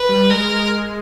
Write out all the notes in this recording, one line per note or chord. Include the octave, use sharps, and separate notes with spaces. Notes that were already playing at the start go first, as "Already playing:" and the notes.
Already playing: B4
G3
G#3 A#4